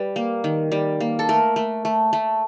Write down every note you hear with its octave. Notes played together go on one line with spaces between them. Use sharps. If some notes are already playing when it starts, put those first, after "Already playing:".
Already playing: G3 B4
A#3
D#3
G3
A#3
A4
A3 A#4
A3
A3
A3